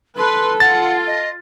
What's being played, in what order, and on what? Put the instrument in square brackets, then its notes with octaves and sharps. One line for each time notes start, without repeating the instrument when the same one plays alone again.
[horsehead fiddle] A4 [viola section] B4 [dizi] C6
[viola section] F4 [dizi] F#5 [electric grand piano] A6
[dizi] D#5